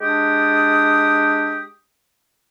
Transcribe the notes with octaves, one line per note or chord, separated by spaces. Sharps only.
G#3 D4 G4 D#6